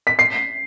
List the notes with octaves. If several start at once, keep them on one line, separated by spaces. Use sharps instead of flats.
B6
C7